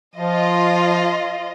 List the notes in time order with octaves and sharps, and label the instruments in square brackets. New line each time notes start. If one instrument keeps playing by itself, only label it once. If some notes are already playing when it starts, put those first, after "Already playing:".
[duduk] F3 [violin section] F4 D#5